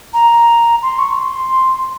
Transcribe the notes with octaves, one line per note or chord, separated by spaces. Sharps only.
A#5
C6
C#6
C#6
C6